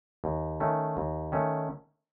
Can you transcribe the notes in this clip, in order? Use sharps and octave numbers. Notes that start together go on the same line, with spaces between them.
D#2
D#3 A3 C#4
D#2
D#3 A3 C#4